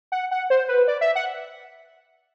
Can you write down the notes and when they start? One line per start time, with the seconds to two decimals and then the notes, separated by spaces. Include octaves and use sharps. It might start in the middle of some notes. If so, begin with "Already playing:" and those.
0.12 F#5
0.31 F#5
0.50 C5
0.68 B4
0.88 D5
1.01 E5
1.15 F#5